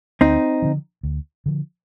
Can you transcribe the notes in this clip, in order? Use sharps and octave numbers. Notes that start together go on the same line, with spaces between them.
D2 C4 D#4
D3 F3
D2
D3 F3